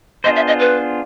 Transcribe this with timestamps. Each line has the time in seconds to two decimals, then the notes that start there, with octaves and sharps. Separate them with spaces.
0.24 B3 D4 F4 G#4 C5 D#5
0.36 E5
0.48 D#5
0.60 B4